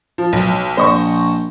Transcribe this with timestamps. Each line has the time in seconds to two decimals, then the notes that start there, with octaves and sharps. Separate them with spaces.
0.18 F3
0.33 B1
0.77 A#1 C5 D#5 C#6